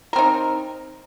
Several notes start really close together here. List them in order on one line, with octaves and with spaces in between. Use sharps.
A#4 C4 D#4